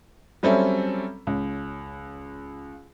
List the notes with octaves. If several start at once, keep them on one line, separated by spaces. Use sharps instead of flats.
F#3 G3 C4 C#4 A4 E5
C#2